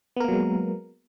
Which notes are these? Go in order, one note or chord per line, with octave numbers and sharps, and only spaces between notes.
F#3 G#3 A#3 B3 A#4